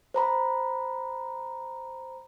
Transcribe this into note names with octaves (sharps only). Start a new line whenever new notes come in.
C5 A#5 B5